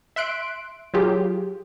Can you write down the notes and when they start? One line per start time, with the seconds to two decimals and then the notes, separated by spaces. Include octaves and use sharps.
0.16 E5 C6 F#6 D7
0.94 F#3 F4 G4 G#4